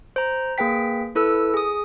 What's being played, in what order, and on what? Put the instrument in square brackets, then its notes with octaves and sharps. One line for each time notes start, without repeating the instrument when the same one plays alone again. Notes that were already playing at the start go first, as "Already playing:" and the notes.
[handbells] C5 A#5
A#3 G#4 B4 G5 B6
E4 A4 B4 E6
G#4 D#6